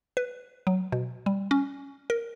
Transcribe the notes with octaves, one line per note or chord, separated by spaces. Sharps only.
B4
F#3
B2
G3
C#4
A#4